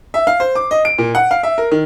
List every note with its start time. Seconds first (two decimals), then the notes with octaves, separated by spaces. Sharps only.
0.14 E5
0.27 F5
0.40 C5
0.55 D6
0.71 D#5
0.85 D7
0.98 A#2
1.15 F#5
1.31 F5
1.43 E5
1.58 A#4
1.72 D#3